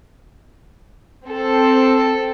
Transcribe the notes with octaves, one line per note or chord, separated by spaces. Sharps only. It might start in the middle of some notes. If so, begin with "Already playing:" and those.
C4 A4